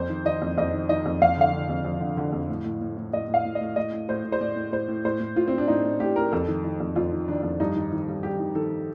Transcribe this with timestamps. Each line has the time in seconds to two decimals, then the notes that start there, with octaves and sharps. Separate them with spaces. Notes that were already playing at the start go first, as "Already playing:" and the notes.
Already playing: F2 C5
0.09 D#3
0.25 D#3 D#5
0.42 F2
0.58 F2 D#5
0.74 D#3
0.89 D#3 D#5
1.06 F2
1.22 F2 F5
1.37 D3 F5
1.53 D3
1.69 F2
1.85 F2
2.00 D3
2.17 D3
2.33 F2
2.49 A2
2.65 A2
2.81 A2
2.97 A2
3.13 A2 D#5
3.29 A2
3.34 F5
3.45 A2
3.55 D#5
3.61 A2
3.76 A2 D#5
3.93 A2
4.09 A2 C5
4.25 A2
4.32 C5
4.41 A2 D5
4.56 A2
4.72 A2 C5
4.88 A2
5.05 A2 C5
5.20 A2
5.36 A2 F4
5.48 C4
5.53 A2
5.58 D4
5.68 A2 D#4
5.84 A2
6.00 A2 G4
6.16 A2 A#4
6.32 F2 A4
6.48 D#3
6.64 D#3
6.80 F2
6.96 F2 F4
7.12 D#3
7.28 D#3 D4
7.43 F2
7.60 G2 D#4
7.76 D#3
7.92 D#3
8.08 G2
8.23 G2 G4
8.39 D#3
8.55 D#3 A4